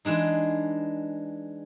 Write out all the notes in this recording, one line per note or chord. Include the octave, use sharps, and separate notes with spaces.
E3 G#3 D4 D#4